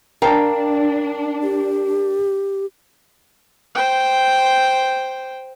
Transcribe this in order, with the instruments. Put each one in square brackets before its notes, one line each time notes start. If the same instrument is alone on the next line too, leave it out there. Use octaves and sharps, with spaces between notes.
[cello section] D4 [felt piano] A#4 A5 [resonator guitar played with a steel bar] F5 G5 A#5
[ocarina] G4
[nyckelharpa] C5 G5